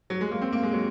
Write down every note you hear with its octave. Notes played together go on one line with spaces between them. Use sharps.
F#3
G#3
A#3
C4
A#3
G#3
F#3